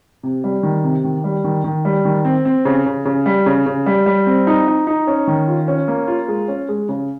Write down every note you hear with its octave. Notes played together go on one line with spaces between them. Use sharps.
C3
G3
D#3
C3
D#3
G3
D#3
D#3
G3
D#3
C4
C4
C#3
C#3
C#3
G3
C#3
C#3
G3
G3
C4
D#4
D#4
D#4
C#4
D#3
F4
C#4
A#3
F4
G#3
C#4
G#3
C#3